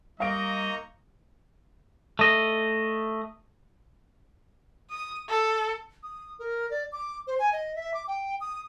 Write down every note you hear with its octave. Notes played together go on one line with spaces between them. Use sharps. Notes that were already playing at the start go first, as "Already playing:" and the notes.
G3 A#3 D#4 D#5 F5 A#5 C#6 D7
A3 D#5
D#6
A4
D#6
A#4
D5
D6
C5
G#5
D#5
E5
D6
G5
D#6